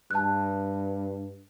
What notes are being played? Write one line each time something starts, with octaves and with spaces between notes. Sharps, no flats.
G2 A5 F#6